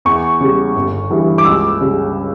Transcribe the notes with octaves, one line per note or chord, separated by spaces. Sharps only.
E2 C#6
C#3 G3
G1
G2 E3 G3
D6
C#2 E6
C#3 G3